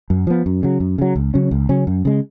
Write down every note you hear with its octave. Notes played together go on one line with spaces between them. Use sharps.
F#2
F3 B3
F#2
C#3 F#3
F#2
C#3 F#3
C#2
C#3 F#3 C#4
C#2
C#3 F#3 C#4
F#2
C#3 G#3